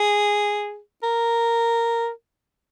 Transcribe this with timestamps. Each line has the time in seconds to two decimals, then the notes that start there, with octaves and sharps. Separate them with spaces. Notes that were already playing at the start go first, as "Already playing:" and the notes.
Already playing: G#4
1.03 A#4